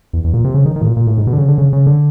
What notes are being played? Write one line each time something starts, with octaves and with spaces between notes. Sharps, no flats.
E2
E2
A#2
C3
C#3
D#3
D#3
A2
A#2
A#2
A2
G#2
B2
D3
C#3
D3
C#3
C#3
D3